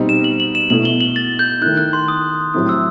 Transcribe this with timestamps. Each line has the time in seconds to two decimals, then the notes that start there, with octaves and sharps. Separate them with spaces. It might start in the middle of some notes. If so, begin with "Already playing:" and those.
Already playing: B2 G3 C4 D#4
0.09 E7
0.24 F#7
0.40 F#7
0.55 E7
0.70 B2 A3 E4 F#7
0.85 G7
1.01 F#7
1.16 A6
1.39 G6
1.61 D#3 A3 E4 F#6
1.77 F#6
1.93 C6
2.08 D#6
2.54 A2 F#3 C4 E4 D#6
2.69 E6